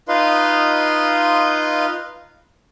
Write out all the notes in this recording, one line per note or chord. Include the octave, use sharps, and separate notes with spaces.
D#4 F4 B4 D#5 F5 C6